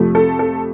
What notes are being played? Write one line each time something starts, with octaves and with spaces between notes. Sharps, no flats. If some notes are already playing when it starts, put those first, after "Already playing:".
Already playing: F2 C3 F3 A3
A4
A4